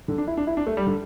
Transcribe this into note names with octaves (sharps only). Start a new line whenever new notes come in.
D3
D4
E4
D4
E4
D4
A3
G3
D3